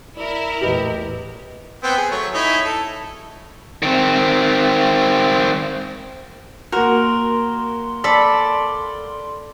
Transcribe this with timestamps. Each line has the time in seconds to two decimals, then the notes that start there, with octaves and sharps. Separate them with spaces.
0.17 E4 A#4 D5
0.61 A#1 E2 A2 G4 B4 D#5
1.83 B3 C4 G5
1.97 G#4
2.11 F#3 A3 C#5
2.34 D#4 E4 C#5
2.65 A4
3.83 D#3 C4
6.72 A#3 F#4 A#4 C6
8.04 A4 D5 B5